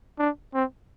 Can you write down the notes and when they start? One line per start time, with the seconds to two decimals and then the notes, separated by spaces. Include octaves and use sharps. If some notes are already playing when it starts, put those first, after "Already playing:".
0.19 D4
0.54 C4